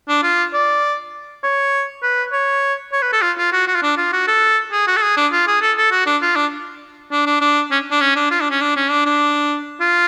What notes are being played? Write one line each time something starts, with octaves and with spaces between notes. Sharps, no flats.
D4
F4
D5
C#5
B4
C#5
C#5
B4
A4
F4
F4
F#4
F#4
F4
D4
F4
F#4
A4
G#4
F#4
A4
G#4
D4
F4
G#4
A4
A4
F#4
D4
F4
D4
D4
D4
D4
C#4
D4
C#4
D4
F4
D4
C#4
D4
C#4
D4
D4
F4